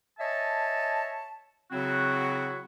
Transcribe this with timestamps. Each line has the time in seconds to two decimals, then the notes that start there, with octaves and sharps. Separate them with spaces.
0.19 C#5 D#5 E5 G#5 A5
1.71 C#3 F#3 C4 E4 F#4